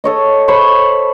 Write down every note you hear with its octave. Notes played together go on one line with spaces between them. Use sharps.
A4 C#5 D#5
C5 C#5 B5 C#6